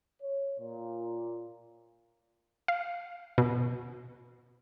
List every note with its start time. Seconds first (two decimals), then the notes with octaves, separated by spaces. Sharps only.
0.22 C#5
0.60 A#2
2.68 F5
3.38 B2